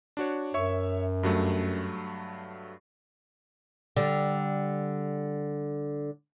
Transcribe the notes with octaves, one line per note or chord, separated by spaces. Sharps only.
D4 F#4 C#5
F#2 C#5 E5 C#6
G2 F#3 A3
D3 G3